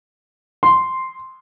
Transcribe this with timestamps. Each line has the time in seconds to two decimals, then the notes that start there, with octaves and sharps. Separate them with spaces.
0.63 C6